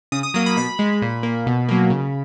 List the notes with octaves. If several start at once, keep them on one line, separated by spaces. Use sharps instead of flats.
C#3 D#6
D#6
F#3 A#3 D#6
B5
B2 B5
G#3
A#2
A#3
B2
F#3 A#3
C#3